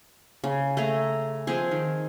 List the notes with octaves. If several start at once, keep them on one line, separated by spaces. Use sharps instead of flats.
C#3
A3 G#4 A#5
F3 C4 G#4
D#3